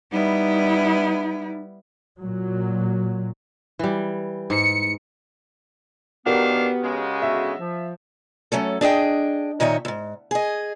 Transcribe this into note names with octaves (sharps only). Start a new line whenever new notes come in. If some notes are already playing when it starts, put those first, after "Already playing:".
G3 B3 D#4 E4
A#2 F#3
E3 G3
G#2 C#7
D#3 B3 D4 F#4 G4 A#4 F5
C#3 G#3
D3 B3 F#4 E5
F3
F#3 A3 C#4 A4
D4 G#4 D#5 G5
A#2 D#3 D#4 C#5 D#5 E5
D#2 G#2
G#4 D#5